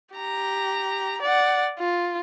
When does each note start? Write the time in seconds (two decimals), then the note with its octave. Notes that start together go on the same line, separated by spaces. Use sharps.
0.15 G4 A#5
1.22 D5 F#5
1.79 F4